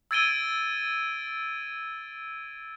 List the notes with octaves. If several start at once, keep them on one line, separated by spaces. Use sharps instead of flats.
E6 G#6 A6 D7 D#7 G7